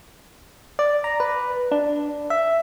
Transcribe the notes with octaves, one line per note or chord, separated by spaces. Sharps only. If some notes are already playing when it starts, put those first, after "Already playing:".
D5
A#5
B4
D4
E5